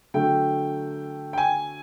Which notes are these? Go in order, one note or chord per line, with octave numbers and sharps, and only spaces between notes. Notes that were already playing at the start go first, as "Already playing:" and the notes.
D3 F#3 A3 G5
G5
G#5